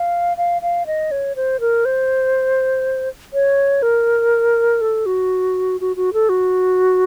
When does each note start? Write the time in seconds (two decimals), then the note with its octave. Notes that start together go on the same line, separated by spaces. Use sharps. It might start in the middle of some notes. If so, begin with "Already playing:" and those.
Already playing: F5
0.37 F5
0.62 F5
0.86 D#5
1.11 C#5
1.36 C5
1.60 A#4
1.85 C5
3.33 C#5
3.82 A#4
4.81 A4
5.06 F#4
5.81 F#4
5.96 F#4
6.13 A4
6.29 F#4